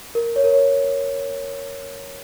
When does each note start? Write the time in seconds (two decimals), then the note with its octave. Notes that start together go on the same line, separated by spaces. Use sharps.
0.15 A#4
0.36 C#5
0.44 A#4
0.52 C#5